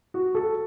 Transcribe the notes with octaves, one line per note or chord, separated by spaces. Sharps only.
F#4
A4